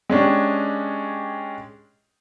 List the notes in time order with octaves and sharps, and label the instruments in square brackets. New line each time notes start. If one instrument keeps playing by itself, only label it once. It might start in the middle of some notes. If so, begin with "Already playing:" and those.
[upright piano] G#3 C#4 D4 G4